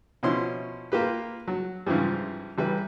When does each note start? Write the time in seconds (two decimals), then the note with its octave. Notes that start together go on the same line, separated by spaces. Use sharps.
0.23 B2 F3 C#4 E4 C6
0.92 A#3 F4 G4 B4
1.48 F#3
1.86 G#2 C#3 E3 F3 G3
2.58 A1 G3 B4